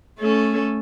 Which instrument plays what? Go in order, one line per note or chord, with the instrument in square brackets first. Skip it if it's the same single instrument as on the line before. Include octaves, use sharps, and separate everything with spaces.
[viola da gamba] A3 C#4 A4